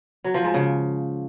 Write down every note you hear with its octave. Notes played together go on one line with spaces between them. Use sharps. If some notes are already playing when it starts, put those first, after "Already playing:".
F#3
F3
G#2
C#3